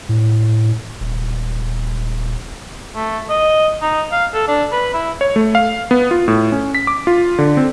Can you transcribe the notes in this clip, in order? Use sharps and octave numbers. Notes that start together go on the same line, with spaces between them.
A2
D#1
A3
D#5
D#4
F5
A4
D4
B4
E4
C#5
A3
F5
B3
F4
A2
C#4
B6
D6
F4
D3
C4